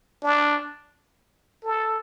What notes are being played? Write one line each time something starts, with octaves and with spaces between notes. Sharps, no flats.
D4
A4